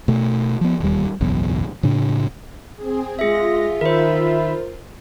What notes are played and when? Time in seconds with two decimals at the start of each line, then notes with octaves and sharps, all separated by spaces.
0.08 B2 A3
0.61 F3 B3
0.80 E1 D#2 G3
1.20 F#1 B1 E2
1.83 A2 C#3 D4
2.76 C4 G#4
3.19 G#3 F4 G#4 E5 A#6
3.81 D#3 A#4 C5 E5 B5